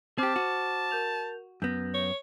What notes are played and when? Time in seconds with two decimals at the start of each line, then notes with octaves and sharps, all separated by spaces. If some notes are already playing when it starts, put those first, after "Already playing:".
0.19 C4 G4 C5 A5 D6 F6
0.36 F#4
0.91 A#4 G6 F7
1.62 F#2 B3 G6 A#6
1.94 C#5